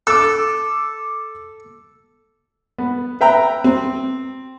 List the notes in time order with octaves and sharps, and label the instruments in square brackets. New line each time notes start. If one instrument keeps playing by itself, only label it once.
[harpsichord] A4 [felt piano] D6 E6
[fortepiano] B3
B4 E5 G5 A#5
C4